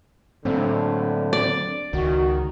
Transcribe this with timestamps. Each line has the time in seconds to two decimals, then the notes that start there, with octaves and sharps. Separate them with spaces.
0.45 A2 D3 F#3 A#3 C4
1.33 D5
1.93 C#2 D#3 F#4